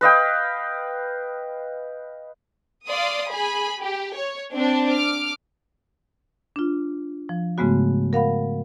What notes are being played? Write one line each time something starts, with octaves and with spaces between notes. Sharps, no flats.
B4 D#5 F5 G5
D5 F5 C6 D#6
G#4 G#5 B5
G4
C#5
C4 D4
D6 F6
D4 F4
F3
G#2 C#3 G#3 A3 B3 F#4
A#4 F5 F#5 B5